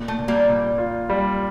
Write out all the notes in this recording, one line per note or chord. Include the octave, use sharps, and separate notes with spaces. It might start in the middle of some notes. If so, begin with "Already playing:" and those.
Already playing: A#2
A3
A#2
G3 A#3
A#2
F4
G3